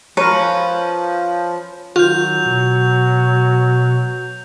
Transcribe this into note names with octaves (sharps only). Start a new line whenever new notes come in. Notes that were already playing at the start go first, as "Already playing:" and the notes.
F3 A#4 B4 C#5
C#4
D#3 F#3 F4 G6 F7
B2